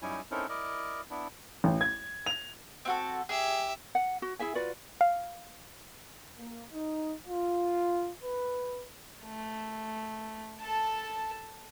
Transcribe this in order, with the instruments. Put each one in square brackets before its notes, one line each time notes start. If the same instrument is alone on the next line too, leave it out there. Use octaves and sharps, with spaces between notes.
[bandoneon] F#2 G3 C#4 D#4 E4 G#5
C4 C#4 D#4 E4 A4 A#4
E4 A#4 D5 D#5
B3 D4 E4
[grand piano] A1
G#6
F7
[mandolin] C4 F#4 A4
[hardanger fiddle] G4 E5 [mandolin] G#4
[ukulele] F#5
F#4
E4 G#4 E5 G#5
F4 F#4 B4 D5
[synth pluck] F5
[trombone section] A#3
D#4
F4
B4
[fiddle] A3
A4 A5